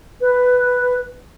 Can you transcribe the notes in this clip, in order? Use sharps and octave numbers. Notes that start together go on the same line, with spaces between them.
B4